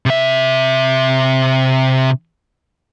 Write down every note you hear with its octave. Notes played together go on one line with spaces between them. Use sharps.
C3 E5